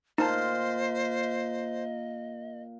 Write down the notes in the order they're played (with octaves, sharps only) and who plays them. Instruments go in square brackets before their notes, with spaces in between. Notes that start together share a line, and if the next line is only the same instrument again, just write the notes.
[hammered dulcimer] A#2 [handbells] D#4 A5 [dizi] C5 [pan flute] D#5